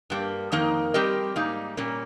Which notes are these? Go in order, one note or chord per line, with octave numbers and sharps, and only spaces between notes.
G2 G3 A#3
F2 D#3 A#3 D#4 A#4
G3 C4 G4 A#4 D#5
G#2 G3 A#3 D#4
A#2 G3 A#3 C#4